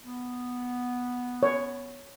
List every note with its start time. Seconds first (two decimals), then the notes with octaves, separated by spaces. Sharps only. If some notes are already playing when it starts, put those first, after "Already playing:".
0.05 B3
1.43 C#5